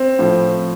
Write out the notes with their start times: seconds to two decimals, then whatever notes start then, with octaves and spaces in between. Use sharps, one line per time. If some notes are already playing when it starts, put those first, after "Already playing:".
Already playing: C4
0.19 A2 F3